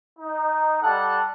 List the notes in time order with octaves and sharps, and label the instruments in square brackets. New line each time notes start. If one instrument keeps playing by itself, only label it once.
[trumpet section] D#4
G3 A4 F#5 A5